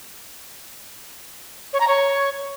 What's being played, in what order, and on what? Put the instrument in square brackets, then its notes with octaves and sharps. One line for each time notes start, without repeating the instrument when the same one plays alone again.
[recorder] C#5
A#5
C#5